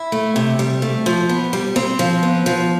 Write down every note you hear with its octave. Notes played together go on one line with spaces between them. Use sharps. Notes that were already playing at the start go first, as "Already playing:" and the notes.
Already playing: E4
A3
C3
G3
A3
F3
B3
G3
C4
F3
B3
F3